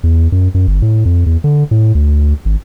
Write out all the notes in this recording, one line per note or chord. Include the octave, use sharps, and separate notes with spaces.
E2
F#2
F#2
G1
A2
F2
E2
D3
A2
D2
G#1